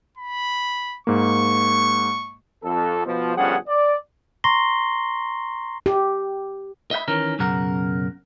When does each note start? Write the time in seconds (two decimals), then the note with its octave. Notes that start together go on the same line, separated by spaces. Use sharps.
0.17 B5
1.07 G#2 A#3 C#6
2.63 F2 A4
3.05 B2 F3
3.36 G1 F3 G3 C#4 G#4 F#5
3.67 D5
4.44 A#5 C6 C#6 A#6 C7 G7
5.86 G4
6.91 D#5 E5 F#5 B5
7.08 D#3 E3 C#4 A#4
7.39 B1 F#2 C#3 A#4 F#5